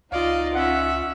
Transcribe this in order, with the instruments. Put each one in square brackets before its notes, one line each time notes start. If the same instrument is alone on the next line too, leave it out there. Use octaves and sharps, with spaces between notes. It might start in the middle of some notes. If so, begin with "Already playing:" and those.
[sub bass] C#2 [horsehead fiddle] D#4 F4 [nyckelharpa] D5 D#5 [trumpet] F5
[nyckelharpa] C#4 E5 [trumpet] F#5